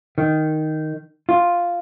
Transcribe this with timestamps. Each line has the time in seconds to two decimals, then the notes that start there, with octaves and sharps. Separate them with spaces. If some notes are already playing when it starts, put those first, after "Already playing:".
0.18 D#3
1.29 F4